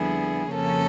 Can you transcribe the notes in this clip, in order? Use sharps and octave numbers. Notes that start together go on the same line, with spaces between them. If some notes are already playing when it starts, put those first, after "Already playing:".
Already playing: F2 D3 G3 B3 E4 G#4
F2 C#3 F3 A#3 C#4 A4